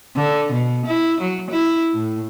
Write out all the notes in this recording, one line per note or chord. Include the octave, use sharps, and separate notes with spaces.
D3
B2
E4
F#3
E4
A2